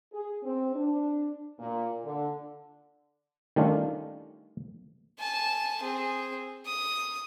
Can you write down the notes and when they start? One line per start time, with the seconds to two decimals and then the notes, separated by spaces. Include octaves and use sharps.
0.12 G#4
0.43 C4
0.75 D4
1.59 A#2
2.05 D3
3.56 D#3 G3 A3 C#4 D4 F4
5.19 G#5 A5
5.83 C4 G#4
6.66 D#6